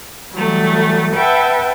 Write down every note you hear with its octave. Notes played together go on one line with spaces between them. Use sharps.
E3 F#3 G3 A3
B4 E5 F#5 G5 A5